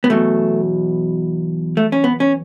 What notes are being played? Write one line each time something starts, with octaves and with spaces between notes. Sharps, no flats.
B3
E2 B2 F#3 A3
A3
C#4
B3
C#4